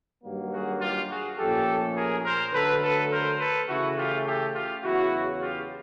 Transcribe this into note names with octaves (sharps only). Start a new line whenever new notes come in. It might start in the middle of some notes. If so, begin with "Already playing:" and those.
G2 D#3 F#3 A#3
F#4 G#4
F4 G4
F#4 G#4
A#2 F3 A3 C#4 G4 A4
G#4 A#4
A#4 C5
D3 F#3 A3 A4 B4
A4 B4
A#4 C5
A4 B4
C#3 E3 A3 E4 F#4
F4 G4
G4 A4
F4 G4
E2 C#3 F#3 E4 F#4
F4 G4